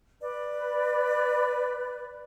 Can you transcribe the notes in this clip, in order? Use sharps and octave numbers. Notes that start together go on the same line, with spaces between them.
B4 D5